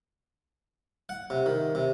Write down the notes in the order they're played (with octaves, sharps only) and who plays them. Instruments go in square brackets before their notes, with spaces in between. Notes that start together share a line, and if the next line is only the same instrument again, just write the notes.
[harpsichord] F#5
C3
D#3
C3